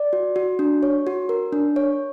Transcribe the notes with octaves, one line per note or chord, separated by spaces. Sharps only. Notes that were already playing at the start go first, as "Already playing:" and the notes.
Already playing: D5
F#4
F#4
D4
C#5
F#4
A#4
D4
C#5